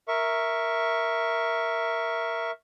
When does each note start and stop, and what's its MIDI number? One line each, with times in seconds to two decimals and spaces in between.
0.08 2.51 70
0.08 2.51 76
0.08 2.51 85